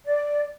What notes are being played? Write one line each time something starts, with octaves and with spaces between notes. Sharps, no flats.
D5